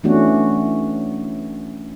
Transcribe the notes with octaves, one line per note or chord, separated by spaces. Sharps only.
E3 A3 B3 C#4 D4 F#4